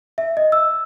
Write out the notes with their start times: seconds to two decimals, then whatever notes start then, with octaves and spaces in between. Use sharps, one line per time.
0.18 E5
0.37 D#5
0.52 E6